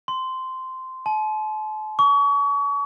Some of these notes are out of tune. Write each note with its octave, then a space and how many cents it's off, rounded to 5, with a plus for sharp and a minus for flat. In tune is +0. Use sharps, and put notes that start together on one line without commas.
C6 -10
A5 -40
C#6 +35